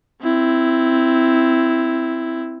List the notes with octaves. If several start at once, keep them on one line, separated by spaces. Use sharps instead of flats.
C4 E4